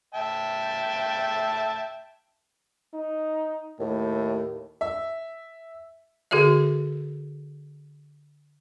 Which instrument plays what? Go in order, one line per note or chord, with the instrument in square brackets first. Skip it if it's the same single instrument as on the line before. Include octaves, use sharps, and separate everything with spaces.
[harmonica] E5 G5 A5
[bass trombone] D#4
[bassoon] D#2 [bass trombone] A2
[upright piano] E5
[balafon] D3 F#4 G#4 A4 E5